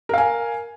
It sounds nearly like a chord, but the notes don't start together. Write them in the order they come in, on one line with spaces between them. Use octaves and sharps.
A#4 F5 G#5